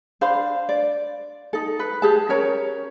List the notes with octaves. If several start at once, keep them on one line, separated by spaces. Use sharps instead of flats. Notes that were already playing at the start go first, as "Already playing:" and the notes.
D4 C5 F5 B5
D5
D#4 A4
B4
G4 G#4 A5
C#4 A#4 C#5 A#5